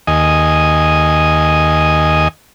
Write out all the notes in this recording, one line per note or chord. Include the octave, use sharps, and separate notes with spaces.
D#2 D#5 G#5